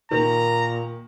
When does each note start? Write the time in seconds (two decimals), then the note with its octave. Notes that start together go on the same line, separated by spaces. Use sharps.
0.11 A#2 D#3 A#5